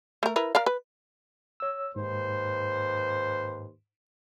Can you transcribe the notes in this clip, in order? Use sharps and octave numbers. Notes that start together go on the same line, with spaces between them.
A3 A#4
E4 A#4 B4
A#4 D5 F5
B4
C#5 E6
D#2 G#2 B4 C5